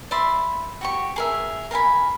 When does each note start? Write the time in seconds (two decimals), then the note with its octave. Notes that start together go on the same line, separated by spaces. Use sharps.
0.11 D5 E5 B5 C6
0.81 F#4 G4 C#6
1.16 G#4 A#4 E5
1.71 A#4 F5 G#5 B5